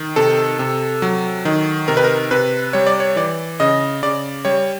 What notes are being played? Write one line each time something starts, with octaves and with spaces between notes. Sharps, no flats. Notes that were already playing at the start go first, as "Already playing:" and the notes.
Already playing: D#3
C3 A4
C3
F#3
D#3
C3 A#4
B4
A#4
C3 B4
G3 C#5
D5
C#5
E3 D5
C#3 D#5
C#3 D5
G3 C#5